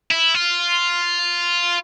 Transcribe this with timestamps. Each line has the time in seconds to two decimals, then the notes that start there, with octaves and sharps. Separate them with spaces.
0.11 E4
0.34 F4